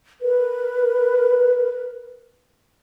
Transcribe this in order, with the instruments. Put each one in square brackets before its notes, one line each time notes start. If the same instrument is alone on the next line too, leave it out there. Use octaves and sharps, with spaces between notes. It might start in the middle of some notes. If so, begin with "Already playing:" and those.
[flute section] A#4 B4